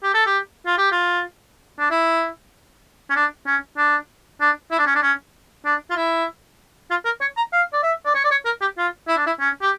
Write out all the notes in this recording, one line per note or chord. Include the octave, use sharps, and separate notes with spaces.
G4
A4
G4
F4
G4
F4
D4
E4
C#4
D4
C#4
D4
D4
E4
D4
C#4
D4
C#4
D4
F4
E4
F4
A#4
C#5
A#5
F5
D5
E5
D5
C#5
D5
C#5
A#4
G4
F4
E4
D4
E4
C#4
G4